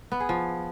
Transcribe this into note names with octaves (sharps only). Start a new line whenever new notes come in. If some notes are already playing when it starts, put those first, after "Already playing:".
B3
G#4
F3